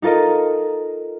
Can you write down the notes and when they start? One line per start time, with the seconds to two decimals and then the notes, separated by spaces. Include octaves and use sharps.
0.02 D#4 F4 A4 A#4 D#5